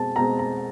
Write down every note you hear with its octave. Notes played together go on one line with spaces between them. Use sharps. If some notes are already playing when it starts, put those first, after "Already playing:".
Already playing: B2 G#3 C4 A5
B2 G#3 C4 A#5
A#5